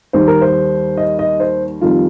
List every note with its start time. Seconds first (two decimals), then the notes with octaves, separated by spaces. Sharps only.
0.13 D#2 D#3 G3 C5
0.27 A#4
0.41 C5
0.97 D#5
1.19 D#5
1.40 C5
1.81 F2 D#3 G3 F4